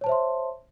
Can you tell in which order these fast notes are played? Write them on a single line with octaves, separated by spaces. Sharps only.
C#5 A5 C5 E5 C6